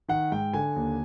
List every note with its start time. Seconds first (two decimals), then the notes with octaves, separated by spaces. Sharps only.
0.08 D#3 F#5
0.32 G#2 G5
0.54 D3 G#5
0.76 D#2